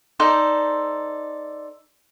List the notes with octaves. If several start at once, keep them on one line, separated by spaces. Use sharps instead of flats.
D#4 A4 C5 D5